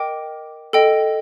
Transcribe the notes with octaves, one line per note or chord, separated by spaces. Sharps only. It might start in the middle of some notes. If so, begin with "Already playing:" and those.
Already playing: A#4 D#5 G5 D6
A4 D#5 G5